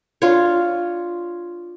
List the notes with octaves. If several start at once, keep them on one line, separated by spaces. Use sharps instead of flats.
D4 F4 C#5